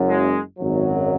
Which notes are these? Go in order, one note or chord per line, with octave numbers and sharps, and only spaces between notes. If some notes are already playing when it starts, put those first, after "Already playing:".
Already playing: F#1 F#2 F#3
G#3
G#1 F#2 F#3